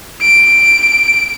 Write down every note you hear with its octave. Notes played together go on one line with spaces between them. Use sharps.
D7